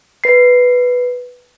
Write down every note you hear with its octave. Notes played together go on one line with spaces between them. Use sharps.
B4 C7